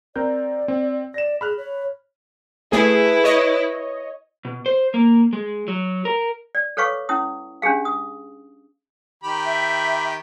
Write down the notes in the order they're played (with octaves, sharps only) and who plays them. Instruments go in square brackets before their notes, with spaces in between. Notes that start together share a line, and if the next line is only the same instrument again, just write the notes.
[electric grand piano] C4 A#4 G6 [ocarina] D5
[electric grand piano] C4
[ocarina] D5 [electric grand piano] A#6 E7
[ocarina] G#4 [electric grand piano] B5 F6 F#6
[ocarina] C#5
[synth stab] A3 G#4 [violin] E4 B4
[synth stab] C#5 D#5
[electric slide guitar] B2
C5
A#3
G#3
F#3
A#4
[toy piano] D5
A4 B4 C#5 F5 C#6 D6
C#4 E4 D#6
C#4 D4 G4 G#4 F5
D#6
[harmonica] D#3 G4 B5
[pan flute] E5